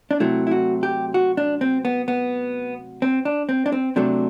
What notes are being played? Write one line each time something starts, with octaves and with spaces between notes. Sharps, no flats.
D4
C3 F#3 A3 E4
E4
F#4
G4
F#4
D4
C4
B3
B3
C4
D4
C4
D4
C4
C3 F#3 A3 D4